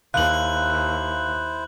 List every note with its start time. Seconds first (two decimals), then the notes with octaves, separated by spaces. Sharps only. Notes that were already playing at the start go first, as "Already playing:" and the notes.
0.14 D#2 E4 C5 F5 F#6 F#7